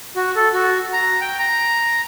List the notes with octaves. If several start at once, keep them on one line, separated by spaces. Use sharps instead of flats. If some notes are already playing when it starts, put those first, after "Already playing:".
F#4
A4
F#4
A#5
G5
A#5